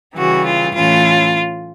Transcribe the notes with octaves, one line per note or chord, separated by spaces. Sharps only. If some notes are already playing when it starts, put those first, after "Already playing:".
C#3 E3 G3 F#4
F4
A2 E3 A3 C#4 F4